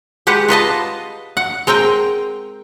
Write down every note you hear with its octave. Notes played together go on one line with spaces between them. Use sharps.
G#3 G4 B4 F#5
F4 B4 D#5 A5
F#5
G#3 C4 A#4 G5